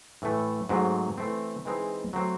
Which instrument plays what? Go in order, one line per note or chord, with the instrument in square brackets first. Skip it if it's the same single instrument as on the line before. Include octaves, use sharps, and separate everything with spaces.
[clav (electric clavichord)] A2 E3 A3
G#2 F#3 A3 C4
E3 A3 C4
E3 G#3 C4 D#4 G#4
F#3 A3 C4 F#4